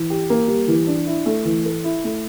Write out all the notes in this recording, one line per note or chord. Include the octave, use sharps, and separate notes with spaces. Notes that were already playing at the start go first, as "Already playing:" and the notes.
Already playing: E3
G4
A#3
G3
E3
D4
E4
A3
E3
A4
E4
A3